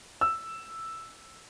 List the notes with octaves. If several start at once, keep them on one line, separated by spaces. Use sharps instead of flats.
E6